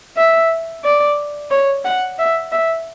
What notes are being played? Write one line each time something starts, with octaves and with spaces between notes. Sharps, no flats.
E5
D5
C#5
F#5
E5
E5